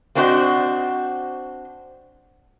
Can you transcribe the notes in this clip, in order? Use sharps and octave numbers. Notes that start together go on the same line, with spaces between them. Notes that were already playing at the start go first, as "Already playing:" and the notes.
A#3 C4 D4 F#4 C5 D#5